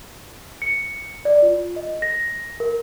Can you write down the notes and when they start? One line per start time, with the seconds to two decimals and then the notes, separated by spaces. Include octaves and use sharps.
0.62 C#7
1.25 D5
1.42 F4
1.76 D#5
2.02 A#6
2.60 A#4